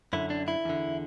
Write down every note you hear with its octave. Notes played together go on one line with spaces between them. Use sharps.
F#2 D3 E4
D4
E4
E2 D3